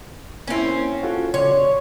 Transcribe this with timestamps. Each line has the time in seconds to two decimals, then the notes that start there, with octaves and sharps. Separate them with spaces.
0.47 A#3 C4 C#4 E4
1.03 F4 F#4 A4
1.34 C#3 C#5 D5 C6